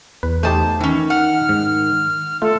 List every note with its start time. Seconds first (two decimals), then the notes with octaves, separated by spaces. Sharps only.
0.23 E2 B4
0.43 A3 D#4 G4 C5 A5
0.80 D#3 E3 C#4
1.10 F#5 F6
1.49 G#2
2.42 A3 F4 A4